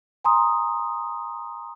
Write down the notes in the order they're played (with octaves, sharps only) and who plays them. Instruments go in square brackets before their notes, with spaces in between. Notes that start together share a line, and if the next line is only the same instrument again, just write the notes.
[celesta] G#5 A#5 C6 D#6